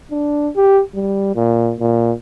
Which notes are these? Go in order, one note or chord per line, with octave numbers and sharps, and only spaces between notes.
D4
G4
G3
A#2
A#2